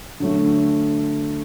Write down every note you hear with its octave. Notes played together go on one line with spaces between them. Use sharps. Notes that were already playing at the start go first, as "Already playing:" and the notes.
D3 F#3 A3